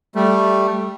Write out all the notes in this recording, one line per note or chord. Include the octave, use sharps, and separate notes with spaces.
G3 A3